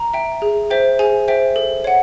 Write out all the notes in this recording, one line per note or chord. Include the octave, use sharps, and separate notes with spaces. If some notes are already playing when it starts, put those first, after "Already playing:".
Already playing: A#5
E5 G5
G#4
C5 E5 G5
G#4 G#5
C5 E5 G5
A4
C#5 F#5